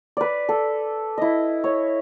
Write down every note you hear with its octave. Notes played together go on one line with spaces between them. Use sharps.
B4 D5
A4
E4 D#5
C#5